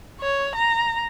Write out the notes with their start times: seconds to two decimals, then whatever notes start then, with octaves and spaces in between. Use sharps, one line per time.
0.21 C#5
0.55 A#5